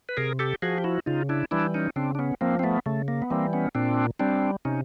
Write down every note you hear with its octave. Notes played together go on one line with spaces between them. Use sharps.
B4
C3 G#4 A#4
G4 A4
F3 F#4 G#4
G4
E4 F#4
C#3 D#4 F4
D4 E4
E3 G3 D4 E4
C#4 D#4
C#3 C4 D4
D4
B3 C#4
F3 A#3 C4
C4
A3 B3
C#3 A3
A#3
B3
E3 G3 A#3 C4
B3 C#4
A#2 C4 D4
G3 C4 D4
C3 C#4 D#4